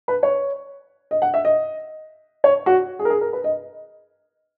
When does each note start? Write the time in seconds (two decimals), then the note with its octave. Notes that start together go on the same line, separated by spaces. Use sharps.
0.08 B4
0.23 C#5
1.11 D#5
1.22 F#5
1.34 E5
1.45 D#5
2.44 C#5
2.66 F#4
2.99 G#4
3.05 A#4
3.10 G#4
3.21 A#4
3.33 B4
3.44 D#5